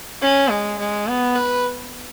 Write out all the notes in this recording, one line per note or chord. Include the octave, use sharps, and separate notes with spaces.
C#4
G#3
G#3
B3
B4